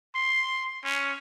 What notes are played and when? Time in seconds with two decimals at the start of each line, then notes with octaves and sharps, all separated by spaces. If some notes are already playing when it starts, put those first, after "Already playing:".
0.15 C6
0.84 C#4